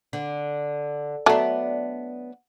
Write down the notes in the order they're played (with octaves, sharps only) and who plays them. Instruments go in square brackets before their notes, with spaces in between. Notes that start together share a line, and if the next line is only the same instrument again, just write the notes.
[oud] D3
[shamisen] F#3 A3 [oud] B3 D4